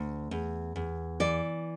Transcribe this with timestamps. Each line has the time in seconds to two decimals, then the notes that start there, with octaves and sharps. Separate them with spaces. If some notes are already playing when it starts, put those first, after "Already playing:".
Already playing: D2
0.31 E2
0.76 E2
1.20 E3 D5